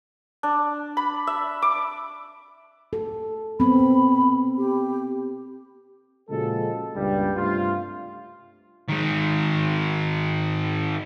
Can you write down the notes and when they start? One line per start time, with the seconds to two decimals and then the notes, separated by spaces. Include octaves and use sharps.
0.43 D4
0.97 B5
1.27 E5
1.62 D6
2.93 A4
3.60 B3 C4 B5
4.57 G4
6.30 A#2 C#3 F3 G#3 F#4 A4
6.95 C#2 G2 A#2 G3
7.36 G2 C3 A3 F4
8.89 D#3 G#3